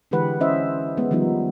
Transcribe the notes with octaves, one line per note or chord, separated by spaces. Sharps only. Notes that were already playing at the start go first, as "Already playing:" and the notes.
D3 E3 G#3 G4 B4 F#5
C#4 E4 C5 D#5 E5
G#3 B3
D#3 F3 G3 B3 D#4